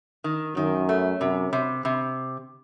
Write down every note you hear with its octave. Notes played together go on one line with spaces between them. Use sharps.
D#3
F#2 D#3
A3
F#2 C3
C3
C3